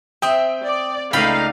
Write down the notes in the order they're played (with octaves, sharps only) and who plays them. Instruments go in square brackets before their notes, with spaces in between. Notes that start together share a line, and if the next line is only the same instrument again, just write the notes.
[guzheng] C4 E5 [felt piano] G5 D#6
[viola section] D5
[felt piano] C#2 A3 [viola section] D#4 F5 [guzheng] D5 G5 B5